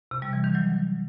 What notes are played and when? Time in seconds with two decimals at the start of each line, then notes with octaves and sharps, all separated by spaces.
0.11 C3
0.22 G3
0.33 E3
0.44 D#3
0.55 F#3